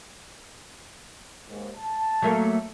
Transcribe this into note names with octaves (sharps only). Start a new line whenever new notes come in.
D#2 G#2
A5
F#3 A3 A#3